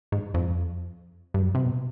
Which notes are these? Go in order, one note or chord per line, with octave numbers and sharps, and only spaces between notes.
G#2
F2
G2
F#2
C3
B2